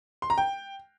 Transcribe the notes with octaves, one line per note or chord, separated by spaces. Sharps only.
C6
A#5
G5